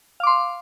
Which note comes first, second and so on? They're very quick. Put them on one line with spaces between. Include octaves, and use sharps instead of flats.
F5 D6 C6